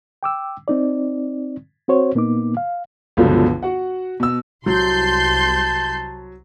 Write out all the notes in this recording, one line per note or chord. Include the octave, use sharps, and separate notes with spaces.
G5 D6 E6
C4 D#4 D5
C4 F#4 C5 C#5
A#2 A#3 B3 D#4 D6
F5
G1 C#2 B2 D3 F3 F#3
F#4 F#5
B2 E6
C2 F#3 A5 C6 G6